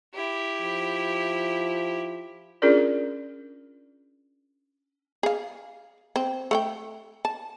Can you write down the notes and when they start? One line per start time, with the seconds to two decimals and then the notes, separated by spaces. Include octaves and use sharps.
0.14 E4 G4
0.61 F3
2.62 C#4 D4 F4 G#4 A#4 D5
5.23 G#4 F5
6.16 C4
6.51 A3 F#5 G5
7.25 A5